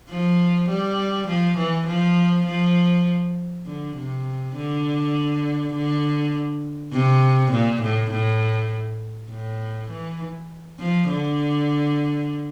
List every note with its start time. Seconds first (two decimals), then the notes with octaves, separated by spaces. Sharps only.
0.09 F3
0.69 G3
1.28 F3
1.58 E3
1.87 F3
2.47 F3
3.66 D3
3.96 C3
4.56 D3
5.74 D3
6.92 C3
7.52 A#2
7.82 A2
8.11 A2
9.30 A2
9.90 E3
10.79 F3
11.09 D3